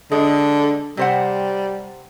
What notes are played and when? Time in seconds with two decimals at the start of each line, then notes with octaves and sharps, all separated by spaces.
0.12 D3 G#3
0.97 C3 G3 C5 F#5